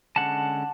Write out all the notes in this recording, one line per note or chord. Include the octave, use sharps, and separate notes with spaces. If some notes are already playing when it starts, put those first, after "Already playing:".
D3 G#3 C#4 F#5 A5